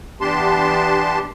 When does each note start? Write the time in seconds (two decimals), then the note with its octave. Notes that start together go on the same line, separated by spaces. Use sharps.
0.21 E3 B3 D4 G4 A5 C6